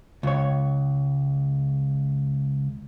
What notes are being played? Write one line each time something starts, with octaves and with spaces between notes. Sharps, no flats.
C#2 C#5